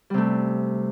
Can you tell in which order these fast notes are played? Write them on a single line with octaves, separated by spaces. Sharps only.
G3 C3 A3